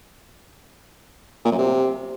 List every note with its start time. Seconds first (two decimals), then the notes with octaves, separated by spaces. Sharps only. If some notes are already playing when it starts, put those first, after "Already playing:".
1.45 A#2
1.52 F#2
1.59 C3